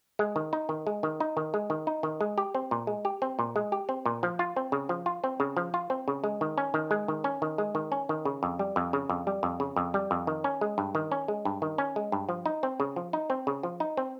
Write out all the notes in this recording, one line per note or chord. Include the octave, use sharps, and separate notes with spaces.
G#3
D#3
D#4
D#3
G#3
D#3
D#4
D#3
G#3
D#3
D#4
D#3
G#3
G4
C4
A#2
G#3
G4
C4
A#2
G#3
G4
C4
A#2
F3
F4
C4
C#3
F3
F4
C4
C#3
F3
F4
C4
C#3
G#3
D#3
C#4
D#3
G#3
D#3
C#4
D#3
G#3
D#3
C#4
D#3
C#3
F2
G3
F2
C#3
F2
G3
F2
C#3
F2
G3
F2
D#3
C#4
G#3
G2
D#3
C#4
G#3
G2
D#3
C#4
G#3
G2
F3
D#4
C4
C#3
F3
D#4
C4
C#3
F3
D#4
C4